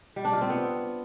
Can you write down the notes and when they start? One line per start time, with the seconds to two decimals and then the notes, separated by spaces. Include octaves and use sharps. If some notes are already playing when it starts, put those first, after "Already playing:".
0.16 G3
0.25 D4
0.33 F4
0.41 C4
0.50 B3